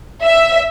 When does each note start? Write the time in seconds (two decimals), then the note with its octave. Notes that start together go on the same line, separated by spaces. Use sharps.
0.22 E5